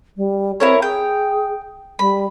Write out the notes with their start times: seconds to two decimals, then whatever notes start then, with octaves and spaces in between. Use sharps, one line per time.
0.17 G3
0.60 C4 E4 A#4 C#5
0.82 G#4 G5
1.99 G3 B5